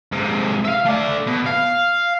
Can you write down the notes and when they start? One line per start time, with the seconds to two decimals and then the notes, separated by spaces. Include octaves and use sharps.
0.12 G#2 C3
0.65 E5 F5
0.86 A3 D5
1.27 B2
1.46 F5